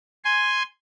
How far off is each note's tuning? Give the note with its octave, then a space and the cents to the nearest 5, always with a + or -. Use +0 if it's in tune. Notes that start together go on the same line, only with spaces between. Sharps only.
G#5 +0 C6 +0